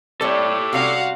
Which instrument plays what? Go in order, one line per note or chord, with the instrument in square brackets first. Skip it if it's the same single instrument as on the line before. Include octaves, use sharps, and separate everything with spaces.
[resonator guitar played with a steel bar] G3 C4 [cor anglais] G4 [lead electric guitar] A4 C#5
[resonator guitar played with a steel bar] C3 G3 C#4 [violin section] F#4 F5 F#5